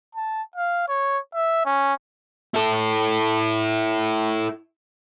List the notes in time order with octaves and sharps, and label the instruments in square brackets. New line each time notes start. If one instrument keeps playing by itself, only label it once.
[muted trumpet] A5
F5
C#5
E5
C#4
[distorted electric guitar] E4 A4